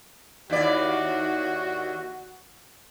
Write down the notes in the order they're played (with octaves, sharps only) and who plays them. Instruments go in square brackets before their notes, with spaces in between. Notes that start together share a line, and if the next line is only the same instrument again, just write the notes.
[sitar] D#2 E4 D5 [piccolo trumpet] F#4